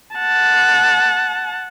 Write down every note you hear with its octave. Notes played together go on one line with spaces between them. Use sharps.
F#5 A5